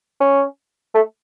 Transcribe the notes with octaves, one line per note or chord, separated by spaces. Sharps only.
C#4
A3